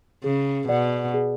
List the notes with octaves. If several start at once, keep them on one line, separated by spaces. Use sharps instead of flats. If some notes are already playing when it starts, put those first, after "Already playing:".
C#3 G#4
B2 D5 F#5
G#4